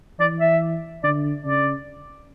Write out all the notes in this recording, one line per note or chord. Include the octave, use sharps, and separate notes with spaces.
E3 D5
E5
D3 D5
C#3 D5